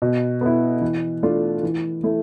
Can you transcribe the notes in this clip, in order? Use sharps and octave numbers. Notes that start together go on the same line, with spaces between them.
B2
B3 E4
E3
A3 D4 F4
E3
A3 E4